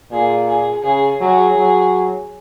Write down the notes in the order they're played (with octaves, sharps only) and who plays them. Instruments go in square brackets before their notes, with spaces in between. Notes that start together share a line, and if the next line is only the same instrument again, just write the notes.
[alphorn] A#2 [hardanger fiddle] G#4
[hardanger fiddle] G#4
[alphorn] C#3 [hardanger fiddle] G#4
[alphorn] F#3 [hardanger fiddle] G#4
[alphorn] F#3